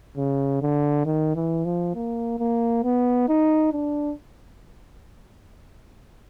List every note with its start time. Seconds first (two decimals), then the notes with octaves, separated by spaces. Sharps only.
0.17 C#3
0.62 D3
1.06 D#3
1.35 E3
1.65 F3
1.95 A#3
2.39 A#3
2.84 B3
3.28 D#4
3.73 D4